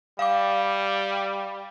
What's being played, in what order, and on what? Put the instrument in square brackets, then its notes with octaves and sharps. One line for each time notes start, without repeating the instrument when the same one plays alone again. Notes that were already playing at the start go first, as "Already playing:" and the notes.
[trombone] G3 [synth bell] F5 D6